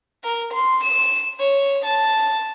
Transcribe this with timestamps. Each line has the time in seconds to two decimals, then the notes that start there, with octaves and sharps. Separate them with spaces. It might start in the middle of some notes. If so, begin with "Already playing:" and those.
0.24 A#4
0.53 C6
0.83 E7
1.40 C#5
1.85 A5